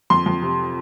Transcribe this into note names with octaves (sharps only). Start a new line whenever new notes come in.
F2 C6
F2
C3